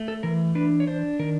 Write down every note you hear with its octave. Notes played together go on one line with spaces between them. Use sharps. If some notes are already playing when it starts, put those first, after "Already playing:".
Already playing: A3
A4
E3 A#4
D4 B4
C#5
D4 C5
D#3 A#4